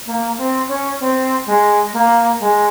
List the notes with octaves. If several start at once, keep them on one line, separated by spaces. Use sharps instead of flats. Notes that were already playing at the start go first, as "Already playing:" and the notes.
A#3
C4
C#4
C4
G#3
A#3
G#3